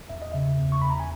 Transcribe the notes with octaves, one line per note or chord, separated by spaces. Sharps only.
E2 E5
D#5
C#3 E5
E2
C#6
E2 B5
A#5
G#5